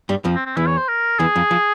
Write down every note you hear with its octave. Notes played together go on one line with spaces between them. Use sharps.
G2 G3
F2 F3
C4
C4
E2 E3 E4
C#5
C5
A#4
E2 E3 G#4
F2 F3
F3